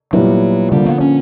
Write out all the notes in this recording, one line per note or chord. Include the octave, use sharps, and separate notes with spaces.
A#2 F#3 G3 B3 E4
D3 F3 G3 A#3
B3
C#4